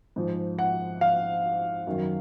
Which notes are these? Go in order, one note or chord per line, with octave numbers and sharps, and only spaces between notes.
G#2 F3
F#5
F5
F#2 D#3 F#3